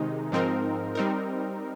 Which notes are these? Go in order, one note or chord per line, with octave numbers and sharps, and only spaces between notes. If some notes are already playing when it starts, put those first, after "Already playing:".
Already playing: C3 D#3 G#3 D#4
G#2 F3 C4 D#4 A#4
G3 C4 D#4 A#4